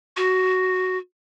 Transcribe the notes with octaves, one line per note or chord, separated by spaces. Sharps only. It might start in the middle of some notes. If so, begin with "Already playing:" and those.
F#4